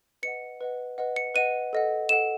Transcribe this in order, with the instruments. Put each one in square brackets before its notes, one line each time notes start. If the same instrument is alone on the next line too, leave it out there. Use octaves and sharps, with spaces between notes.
[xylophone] B4 D#5 F#5 C#7
B4 D#5 F#5
B4 D#5 F#5
C#7
B4 D#5 F#5 D#7
A4 D#5 F#5
A4 D#5 F#5 E7